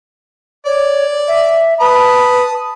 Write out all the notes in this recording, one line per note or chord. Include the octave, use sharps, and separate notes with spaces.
C#5 D5
E5
B4 A5 B5 D#6